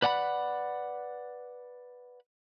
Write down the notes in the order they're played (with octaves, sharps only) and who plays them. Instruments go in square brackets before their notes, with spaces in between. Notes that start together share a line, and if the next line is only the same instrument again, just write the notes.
[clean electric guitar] B4 D5 F#5 G5 B5